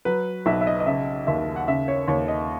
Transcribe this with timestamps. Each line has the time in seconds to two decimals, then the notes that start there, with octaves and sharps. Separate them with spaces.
0.05 F#3 B4
0.46 B1 E5
0.61 E5
0.67 D#5
0.80 D#5
0.86 C#3 E5
1.27 D#2 E5
1.56 F#5
1.68 C#3 E5
1.88 C#5
2.08 D#2 C#5
2.28 D#5